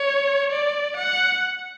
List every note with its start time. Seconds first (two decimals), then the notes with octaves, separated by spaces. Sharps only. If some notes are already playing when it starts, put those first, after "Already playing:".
Already playing: C#5
0.52 D5
0.97 F#5